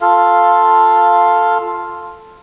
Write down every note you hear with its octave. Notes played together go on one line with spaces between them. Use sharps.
F4 A4 F5